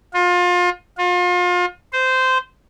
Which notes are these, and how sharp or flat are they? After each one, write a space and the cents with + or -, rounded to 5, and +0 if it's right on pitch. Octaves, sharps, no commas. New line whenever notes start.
F4 +30
F4 +35
C5 -15